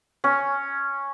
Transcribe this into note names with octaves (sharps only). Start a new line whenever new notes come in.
C#4